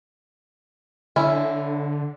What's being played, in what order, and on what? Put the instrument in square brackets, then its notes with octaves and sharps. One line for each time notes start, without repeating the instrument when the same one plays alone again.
[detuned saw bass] D3 [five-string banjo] C#4 E4